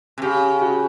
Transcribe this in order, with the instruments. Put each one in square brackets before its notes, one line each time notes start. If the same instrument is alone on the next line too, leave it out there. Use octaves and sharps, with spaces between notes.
[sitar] C3
[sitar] C#3 [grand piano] G4
[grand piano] F#4